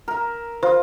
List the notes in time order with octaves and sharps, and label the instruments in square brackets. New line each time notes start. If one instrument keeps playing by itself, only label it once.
[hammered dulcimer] A#4 E5
[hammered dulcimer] F4 [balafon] C5